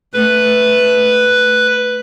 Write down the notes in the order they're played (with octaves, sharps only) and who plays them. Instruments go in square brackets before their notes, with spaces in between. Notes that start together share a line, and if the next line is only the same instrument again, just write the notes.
[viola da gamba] A3 [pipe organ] B4